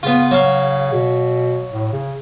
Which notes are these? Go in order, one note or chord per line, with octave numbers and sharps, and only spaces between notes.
C#3 B3 F4
F#3 F5
B2
A2
C#3